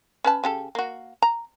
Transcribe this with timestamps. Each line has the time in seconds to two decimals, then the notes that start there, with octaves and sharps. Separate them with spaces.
0.24 C#4 B4 A5
0.44 C#3 G4 A4
0.75 A#3 F#4
1.22 A#5